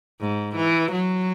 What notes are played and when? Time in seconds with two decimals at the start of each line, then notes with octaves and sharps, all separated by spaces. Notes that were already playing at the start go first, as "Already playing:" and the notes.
0.21 G#2
0.56 E3
0.92 F#3